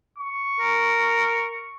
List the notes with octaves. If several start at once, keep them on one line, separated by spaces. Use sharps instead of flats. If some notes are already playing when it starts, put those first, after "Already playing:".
C#6
A#4